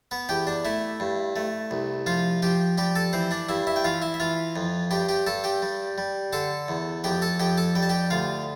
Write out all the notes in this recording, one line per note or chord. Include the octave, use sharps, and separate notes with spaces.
B3 B4
E2 G4 G5
D4 D5
A3 E4 E5
G2
A3
C2
F3 F4 F5
F3 G4 G5
G3 G4 G5
A4 A5
E3 C4 C5
D4 D5
G2 E4 E5
E4 E5
G5
E3 F4 F5
E4 E5
E5
E3 F4 F5
F2
G2 G4 G5
G4 G5
G2 A4 A5
G4 G5
G3
G3
D3 A4 A5
E2
F2 G4 G5
A4 A5
F2 G4 G5
A4 A5
G3 G5
A5
G4 G5
D2 F4 F5